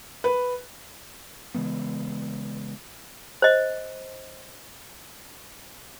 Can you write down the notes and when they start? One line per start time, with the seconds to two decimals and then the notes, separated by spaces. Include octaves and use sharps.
0.24 B4
1.54 C#3 E3 G#3 B3
3.42 C5 D#5